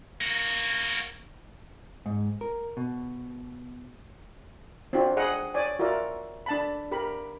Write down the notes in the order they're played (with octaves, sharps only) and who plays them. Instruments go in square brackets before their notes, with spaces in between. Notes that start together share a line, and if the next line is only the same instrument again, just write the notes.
[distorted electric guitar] A#3 F#4
[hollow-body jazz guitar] G#2
A#4
B2
[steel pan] C4 D4 F4 F#4
G#4 D#5 F#5
C#5 D5 G#5
F4 F#4 A#4 D5 E5
D4 A5 B5
G4 A#4 B5